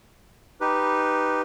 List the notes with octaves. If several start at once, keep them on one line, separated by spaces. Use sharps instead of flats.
D#4 G4 B4